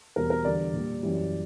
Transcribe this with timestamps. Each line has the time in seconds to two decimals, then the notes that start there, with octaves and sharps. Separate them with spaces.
0.16 E2 B2 G3 A#4
0.30 A#4
0.44 E2 D3 G3 D5
0.73 A#2 G3
1.03 F#2 E3 G3